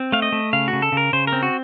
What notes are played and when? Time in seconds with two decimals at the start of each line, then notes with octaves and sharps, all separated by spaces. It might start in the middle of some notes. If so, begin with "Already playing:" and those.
Already playing: C4
0.12 A3 F5
0.22 D#5
0.32 A3
0.53 C#3 F5
0.68 F#4
0.73 C#3
0.82 A4
0.92 C#3 A#4
1.13 C#3 C5
1.27 A#4
1.33 C4
1.43 F#4